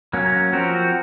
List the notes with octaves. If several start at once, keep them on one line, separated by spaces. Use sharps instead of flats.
F#3 A#3 C#4
F3 C4 F#4 A#4